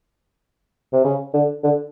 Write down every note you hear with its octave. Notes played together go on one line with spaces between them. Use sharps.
C3
C#3
D3
D3